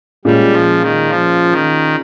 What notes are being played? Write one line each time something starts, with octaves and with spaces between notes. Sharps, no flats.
A#2 G3 G#3 C#4
F3
D#3
F3
D#3